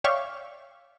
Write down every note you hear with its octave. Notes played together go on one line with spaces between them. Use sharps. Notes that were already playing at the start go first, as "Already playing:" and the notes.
C#5 D5 E5 F5 G5 C#6